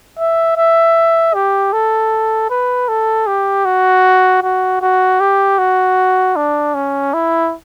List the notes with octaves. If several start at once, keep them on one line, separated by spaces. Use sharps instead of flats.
E5
E5
G4
A4
B4
A4
G4
F#4
F#4
F#4
G4
F#4
D4
C#4
E4